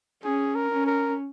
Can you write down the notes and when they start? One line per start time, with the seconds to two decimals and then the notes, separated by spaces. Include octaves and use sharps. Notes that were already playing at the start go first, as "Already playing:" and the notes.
0.23 C#4 G#4
0.56 A#4
0.72 C#4
0.87 A#4